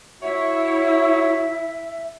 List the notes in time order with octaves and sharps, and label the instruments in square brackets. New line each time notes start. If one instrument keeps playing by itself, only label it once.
[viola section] E4 [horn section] F#4 C#5 [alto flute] E5